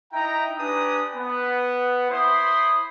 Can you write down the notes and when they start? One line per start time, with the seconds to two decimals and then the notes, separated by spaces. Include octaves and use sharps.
0.13 D#4 E4 G5 A#5
0.58 D4 G4 B4 G#5 A#5 D#6
1.16 B3 B4
2.11 E4 C5 B5 C6 D#6